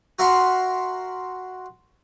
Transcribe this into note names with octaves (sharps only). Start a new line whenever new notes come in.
F#4 A#4 E5 F#5 A#5 C6